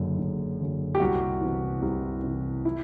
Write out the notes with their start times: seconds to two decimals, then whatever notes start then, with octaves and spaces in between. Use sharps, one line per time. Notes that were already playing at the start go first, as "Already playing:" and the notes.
Already playing: F#1 F#2 D3
0.19 F#1
0.60 F#2 D3
0.95 G4
1.00 C2 F#4
1.41 C3 E3
1.82 C2
2.23 C3 E3
2.65 E4